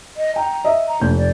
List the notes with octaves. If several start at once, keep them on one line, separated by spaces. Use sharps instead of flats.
D#5
G5 A#5
D#5 E5
A#5
F1 D4 G6
D5